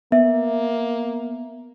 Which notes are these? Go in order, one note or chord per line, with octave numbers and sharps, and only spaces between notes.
A#3 B3 E5